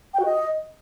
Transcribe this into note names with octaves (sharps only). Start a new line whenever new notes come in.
G5
F#4
D#5